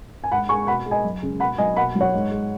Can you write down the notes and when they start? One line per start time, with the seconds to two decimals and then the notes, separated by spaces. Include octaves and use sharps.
0.24 G#5
0.31 G#2 F#5 B5
0.49 G#3 G#5 C#6
0.67 B2 F#5 B5
0.86 G#3
0.91 D#5 G#5
1.04 F#2
1.22 C#3 G#3
1.40 B2 F#5 B5
1.58 F#3 D#5 G#5
1.76 B2 F#5 B5
1.95 F#3
2.00 C#5 F#5
2.13 G#2
2.31 G#3